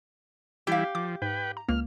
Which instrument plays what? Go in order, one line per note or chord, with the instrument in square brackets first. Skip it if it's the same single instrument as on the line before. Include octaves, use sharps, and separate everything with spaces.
[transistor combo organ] E3 G3 E4 [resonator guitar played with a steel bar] G4 F5
[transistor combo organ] F3 [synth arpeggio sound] D6
[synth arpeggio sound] G#2 [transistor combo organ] B4 G5
[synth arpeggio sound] A#5
[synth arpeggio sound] C#2 A#3 [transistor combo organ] F6